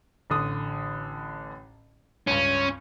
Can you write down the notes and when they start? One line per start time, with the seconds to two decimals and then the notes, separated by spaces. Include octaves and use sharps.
0.30 A1 D3 D#6
2.27 C#2 G2 C#4